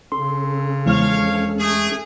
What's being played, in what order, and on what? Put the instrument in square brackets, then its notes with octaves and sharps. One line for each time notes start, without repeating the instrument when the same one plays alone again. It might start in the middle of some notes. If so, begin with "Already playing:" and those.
[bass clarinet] C#3 [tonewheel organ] C#4 A4 [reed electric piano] C6
[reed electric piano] E2 G#3 F6 [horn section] F3 C#5 F5
[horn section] A3 G#4